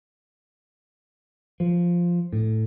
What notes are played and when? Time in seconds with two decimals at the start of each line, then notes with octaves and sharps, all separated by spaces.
1.60 F3
2.33 A2